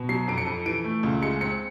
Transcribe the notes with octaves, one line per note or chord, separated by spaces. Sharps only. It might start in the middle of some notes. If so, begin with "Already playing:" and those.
Already playing: B2
F#3 C7
F2 D7
C#7
F2
E3 D7
A3
C#2
G#3 C#7
C4 C#7